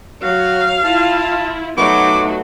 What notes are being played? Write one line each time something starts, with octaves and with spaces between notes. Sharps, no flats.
F#3 F#4 F5
E4 F4 A5
F#3 A3 B3 D#4 F#4 D6